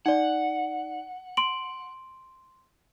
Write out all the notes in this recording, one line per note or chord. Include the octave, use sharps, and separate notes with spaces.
D#4 D5 F#5
C6 D7 F#7